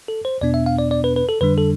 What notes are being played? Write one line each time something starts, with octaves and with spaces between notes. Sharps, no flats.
A4
C5
E2 B2 B3 D4 D5
E5
F5
D5
D5
B4
B4
A4
F2 D3 G3 D4 B4
A4